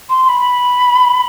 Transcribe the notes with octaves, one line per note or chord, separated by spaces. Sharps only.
C6
C6
B5